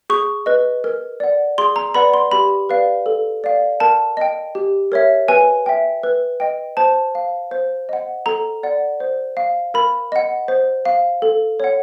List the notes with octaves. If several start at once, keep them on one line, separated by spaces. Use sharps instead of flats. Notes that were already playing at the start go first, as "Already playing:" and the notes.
G#4 C#6
B4 D#5
A#4
D5 F#5
G#4 C6
A#5
B4 D5 F#5 B5
C6
G4 B5
B4 D5 F5
A4
D5 F5
A#4 A5
D#5 G5
G4
A#4 C#5 E5
B4 G#5
E5 G5
B4
D#5 G5
C5 A5
F5
C5
D#5 F#5
A4 A#5
D5 F#5
C5
F5
A#4 B5
D#5 F#5
C5
F5
A4
C#5 F#5